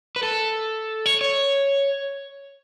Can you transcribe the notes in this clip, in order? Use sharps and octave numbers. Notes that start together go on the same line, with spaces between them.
B4
A4
C#5
C#5